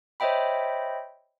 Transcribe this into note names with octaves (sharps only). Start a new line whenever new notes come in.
C5 C#5 D#5 E5 G5 B5